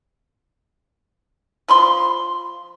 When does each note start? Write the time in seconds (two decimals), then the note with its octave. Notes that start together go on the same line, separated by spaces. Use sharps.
1.68 F3 B5 C6